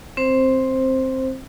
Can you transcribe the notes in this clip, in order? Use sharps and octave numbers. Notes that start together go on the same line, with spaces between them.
C4 C5